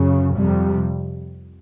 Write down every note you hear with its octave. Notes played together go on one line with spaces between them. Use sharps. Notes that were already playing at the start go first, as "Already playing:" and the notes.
Already playing: F#2 C#3
F2 C3 G3